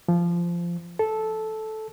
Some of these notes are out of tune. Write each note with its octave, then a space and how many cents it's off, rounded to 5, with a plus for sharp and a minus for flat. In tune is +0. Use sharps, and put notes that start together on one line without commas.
F3 -15
A4 -10